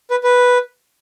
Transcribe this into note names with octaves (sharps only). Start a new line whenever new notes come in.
B4
B4